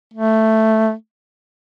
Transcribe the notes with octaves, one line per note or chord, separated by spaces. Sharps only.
A3